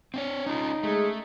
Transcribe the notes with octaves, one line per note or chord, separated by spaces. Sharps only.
C4 D4 C#5
C#4 D#4 F4
G#3 A3 G#4